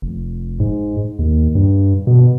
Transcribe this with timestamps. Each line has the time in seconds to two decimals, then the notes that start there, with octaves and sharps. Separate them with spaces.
0.02 F1
0.60 G#2
1.19 D#2
1.55 G2
2.07 B2